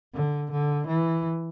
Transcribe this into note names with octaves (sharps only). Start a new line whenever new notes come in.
D3
D3
E3